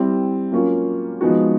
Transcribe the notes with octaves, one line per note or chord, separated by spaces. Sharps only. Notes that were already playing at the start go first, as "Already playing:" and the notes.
Already playing: G3 C4 E4 G4
F#3 A#3 C#4 F4
F3 G#3 B3 D#4 F#4